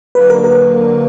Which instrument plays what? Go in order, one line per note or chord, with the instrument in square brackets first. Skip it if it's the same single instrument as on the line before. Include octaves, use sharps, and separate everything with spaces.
[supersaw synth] D3 F#3 A#3 [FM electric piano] B4
[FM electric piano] A#4
A#4